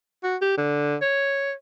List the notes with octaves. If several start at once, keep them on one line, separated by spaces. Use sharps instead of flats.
F#4
G4
D3
C#5